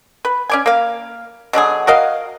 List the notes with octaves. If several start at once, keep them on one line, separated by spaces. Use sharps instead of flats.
B4
C#4 D5 G#5
A#3 F5
B2 D3 F#3 G#4
F#4 A#4 D#5 F5